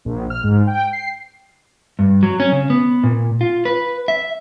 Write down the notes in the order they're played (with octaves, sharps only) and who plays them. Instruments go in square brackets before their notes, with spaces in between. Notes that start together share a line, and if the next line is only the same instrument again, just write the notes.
[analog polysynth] A#1
F6
G#2
G5
C7
[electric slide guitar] G2
F#3
C#4
C#3
B3
A#2
F4
B4
E5